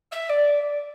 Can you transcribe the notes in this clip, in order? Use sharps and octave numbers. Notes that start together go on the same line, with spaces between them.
E5
D5